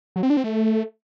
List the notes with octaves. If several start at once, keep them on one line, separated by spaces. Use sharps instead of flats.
F#3
C4
D4
C4
A3